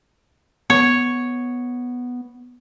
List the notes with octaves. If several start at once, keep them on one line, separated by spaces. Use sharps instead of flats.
B3 C#5